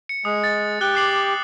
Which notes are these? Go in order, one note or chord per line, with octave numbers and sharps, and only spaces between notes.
C#7
G#3 D#6
A6
G4 F#6 G7
D6 C7 F#7